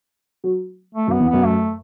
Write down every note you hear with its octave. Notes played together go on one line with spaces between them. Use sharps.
F#3
A3
F#2
B3
E2
F#2 B3
A3